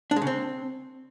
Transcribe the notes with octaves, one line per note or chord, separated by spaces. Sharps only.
D4
G#3
C#3
C4